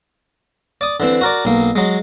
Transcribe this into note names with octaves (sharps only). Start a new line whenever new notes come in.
D5 D#6
D3 E3 C4
F#4 A#4 D5
B1 A#3
F#3 G#3